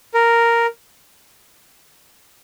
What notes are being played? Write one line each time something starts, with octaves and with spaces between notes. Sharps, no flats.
A#4